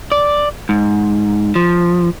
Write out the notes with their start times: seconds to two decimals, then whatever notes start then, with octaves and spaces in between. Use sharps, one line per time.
0.12 D5
0.69 G#2
1.55 F3